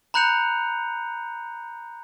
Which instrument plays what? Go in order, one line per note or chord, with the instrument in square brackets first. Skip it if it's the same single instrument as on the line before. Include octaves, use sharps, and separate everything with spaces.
[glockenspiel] A#5 B5 F#6 G6 C#7 F7